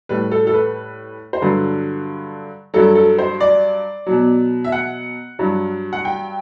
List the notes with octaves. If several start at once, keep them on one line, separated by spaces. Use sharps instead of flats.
A2 G3 B4
A4
A4
B4
C5
G2 D3 F#3 B4
G2 F#3 A4
A4
C5
D5
B2 F#3
E5
F#5
G2 F#3
F#5
G5